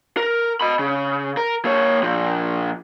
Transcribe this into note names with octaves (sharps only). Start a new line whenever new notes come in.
A#4
D#5 B5
C#3
A#4
A#3 C#5
A#2 F3